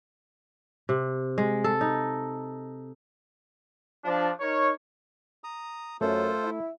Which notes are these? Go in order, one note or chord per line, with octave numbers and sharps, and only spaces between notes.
C3
G#3
A4
D#4
F3 D4
D#4 A#4 C#5
A#5 D#6
F#2 A3 F4 A4 C5
E4